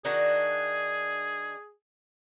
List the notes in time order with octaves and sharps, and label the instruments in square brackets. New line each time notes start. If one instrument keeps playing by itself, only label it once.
[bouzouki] D#3 D4 F#4 [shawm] G#4